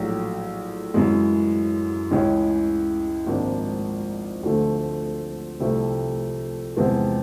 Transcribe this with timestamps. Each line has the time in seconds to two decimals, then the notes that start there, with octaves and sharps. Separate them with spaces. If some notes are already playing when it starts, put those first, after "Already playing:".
Already playing: A#1 A2 F#3
0.94 F#2 C#3 E3 G#3
2.11 C#2 C#3 E3 G#3 C#4
3.26 G#1 G#2 F3 A#3 D4
4.43 D2 D3 F3 A3
5.60 C2 C3 F3 A3
6.76 E2 C3 F3 G#3 B3